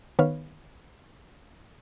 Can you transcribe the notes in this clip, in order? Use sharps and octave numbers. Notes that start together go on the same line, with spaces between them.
D#3 B3 B4 C#5 F5